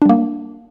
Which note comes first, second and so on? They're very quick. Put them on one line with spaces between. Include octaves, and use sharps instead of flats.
D4 G3 A#3